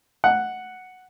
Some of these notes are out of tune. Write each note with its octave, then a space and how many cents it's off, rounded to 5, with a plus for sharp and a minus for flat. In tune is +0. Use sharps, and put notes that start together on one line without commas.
F#5 +0